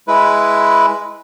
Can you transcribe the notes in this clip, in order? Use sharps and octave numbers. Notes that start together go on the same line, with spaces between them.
G#3 E4 B4